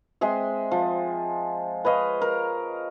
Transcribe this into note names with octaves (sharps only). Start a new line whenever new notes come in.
G#3 C4 G#4 E5
F3
B4 C#5 D#5 F5
A#4